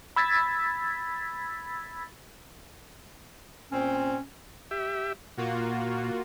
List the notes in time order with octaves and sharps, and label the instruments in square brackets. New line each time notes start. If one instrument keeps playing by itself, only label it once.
[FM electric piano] B5 E6 G#6 A6 B6
[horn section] A#2 C4 [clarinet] C#4
[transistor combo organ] G4 E5
[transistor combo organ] A#2 [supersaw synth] A#3 F4 F#4